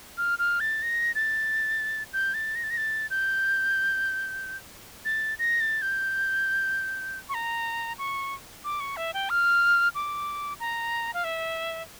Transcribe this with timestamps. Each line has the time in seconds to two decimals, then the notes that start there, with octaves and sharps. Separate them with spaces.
0.18 F6
0.39 F6
0.60 A6
0.82 A#6
1.15 A6
2.13 G6
2.34 A6
2.55 A#6
2.63 A6
2.70 A#6
2.77 A6
3.10 G6
5.05 A6
5.39 A#6
5.60 A6
5.82 G6
7.29 C#6
7.34 A#5
7.98 C#6
8.64 D6
8.80 C#6
8.96 E5
9.14 G5
9.30 F6
9.95 D6
10.60 A#5
11.14 F5
11.24 E5